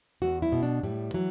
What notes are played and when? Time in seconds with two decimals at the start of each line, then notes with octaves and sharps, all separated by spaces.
0.22 E2 F#4
0.42 E4
0.52 B2
0.63 D4
0.83 A2 G3
1.14 E3 F#3